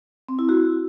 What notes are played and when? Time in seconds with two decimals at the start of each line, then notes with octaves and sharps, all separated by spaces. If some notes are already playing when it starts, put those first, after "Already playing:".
0.29 C4
0.39 E4
0.49 F#4